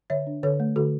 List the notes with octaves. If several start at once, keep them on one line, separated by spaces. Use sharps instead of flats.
D3 C#5 E5
D4
D3 A4 C#5
A3
D3 F#4 A4